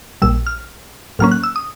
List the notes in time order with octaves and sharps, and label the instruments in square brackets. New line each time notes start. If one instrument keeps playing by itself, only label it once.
[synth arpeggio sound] A#1 A#2 G3 E6
F6
A2 F#3 A#3 C#4 F6
F#6
E6
D#6